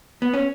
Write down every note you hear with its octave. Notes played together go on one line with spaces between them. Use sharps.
B3
C#4